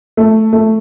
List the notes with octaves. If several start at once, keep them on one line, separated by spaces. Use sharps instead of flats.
A3
A3